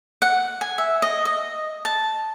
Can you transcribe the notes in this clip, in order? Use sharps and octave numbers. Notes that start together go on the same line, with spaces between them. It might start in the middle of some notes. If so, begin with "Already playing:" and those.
F#5
G#5
E5
D#5
D#5
A5